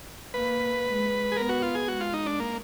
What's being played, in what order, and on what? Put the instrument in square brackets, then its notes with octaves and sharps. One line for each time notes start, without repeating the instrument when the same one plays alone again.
[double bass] A#3 [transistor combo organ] B4
[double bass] G#3
[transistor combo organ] G#4
[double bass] B3 [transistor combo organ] A#4
[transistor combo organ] F#4
F4
G#4
[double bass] G#3 [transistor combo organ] F#4
[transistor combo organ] F4
D#4
D4
A#3